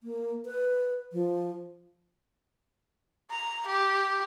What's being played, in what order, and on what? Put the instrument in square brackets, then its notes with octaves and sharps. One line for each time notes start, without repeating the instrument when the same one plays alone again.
[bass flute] A#3
B4
F3
[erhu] A#5
G4